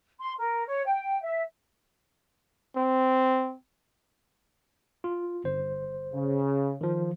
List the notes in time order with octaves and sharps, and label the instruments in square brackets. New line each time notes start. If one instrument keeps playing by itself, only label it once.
[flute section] C6
A#4
C#5
G5
E5
[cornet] C4
[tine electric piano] F4
G1 C5
[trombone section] C#3
[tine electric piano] D#3 F3